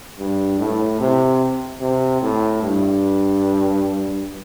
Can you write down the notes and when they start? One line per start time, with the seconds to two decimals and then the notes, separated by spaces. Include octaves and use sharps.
0.19 G2
0.59 A2
1.00 C3
1.81 C3
2.22 A2
2.63 G2